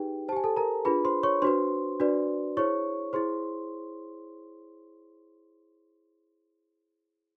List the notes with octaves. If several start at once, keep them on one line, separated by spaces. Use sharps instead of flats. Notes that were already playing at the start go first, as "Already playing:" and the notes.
Already playing: D#4 G4 G#4 B4 G5
G4 C5 G#5 A5
A4 A5
A#4 A#5
D4 F4 G#4 B4 B5
C5 C6
C#5 C#6
D4 F#4 B4 C5 C6
D4 F#4 B4 D5
E4 G#4 C5 C#5 C#6
E4 G#4 C5 C6